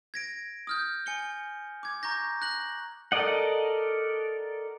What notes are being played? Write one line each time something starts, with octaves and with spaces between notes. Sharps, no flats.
G#6 A#6 D7
D#6 F6 G6
G#5 C#7 G7
D6 G#6
A#5 C#6 G6 A#6
F#6 A#6 F#7
A4 A#4 D5 D#5 F#5